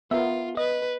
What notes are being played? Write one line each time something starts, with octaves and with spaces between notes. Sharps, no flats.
B3 F4 A#4 E5
B4 D#5